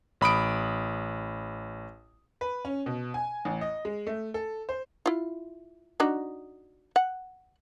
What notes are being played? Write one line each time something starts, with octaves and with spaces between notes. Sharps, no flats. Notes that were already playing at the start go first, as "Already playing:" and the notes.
A1 B5 D#6 D7
B4
C#4
B2
G#5
A1
D#5
G#3
A3
A4
C5
E4 F4
D4 D#4 F#4
F#5